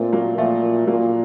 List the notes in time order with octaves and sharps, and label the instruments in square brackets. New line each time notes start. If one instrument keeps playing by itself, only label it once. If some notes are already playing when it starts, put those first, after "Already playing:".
Already playing: [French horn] A#2 [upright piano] A3 C4
[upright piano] F#3 A#3
[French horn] A#2 [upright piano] F3 A3
[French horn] A#2 [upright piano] F#3 A#3